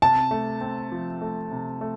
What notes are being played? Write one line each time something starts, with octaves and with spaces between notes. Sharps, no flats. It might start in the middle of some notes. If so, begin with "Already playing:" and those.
C3 A5
A3
C4
F3
A3
C3
A3